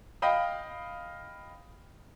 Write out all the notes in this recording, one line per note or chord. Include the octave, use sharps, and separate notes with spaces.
D#5 F5 G5 B5 D#6